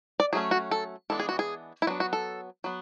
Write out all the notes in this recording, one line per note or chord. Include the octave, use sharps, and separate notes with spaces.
D5
F#3 A3 C#4 G#4
F#4
A4
E3 G#3 B3 D4 A4
G#4
F#4
G#4
E4
F#3 B3 D4 F#4
F#4
A4
F#3 B3